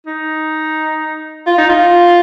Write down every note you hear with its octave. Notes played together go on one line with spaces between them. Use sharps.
D#4
F4
D#4
F4